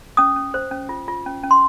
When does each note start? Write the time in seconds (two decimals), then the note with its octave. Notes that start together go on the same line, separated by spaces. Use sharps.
0.17 C#4 D#6
0.36 C#4
0.54 C5
0.71 C#4
0.89 F4
1.08 F4
1.26 C#4
1.44 C#4
1.51 C6